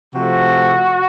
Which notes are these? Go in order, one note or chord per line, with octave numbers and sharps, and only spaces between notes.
C3 F3 A3 F#4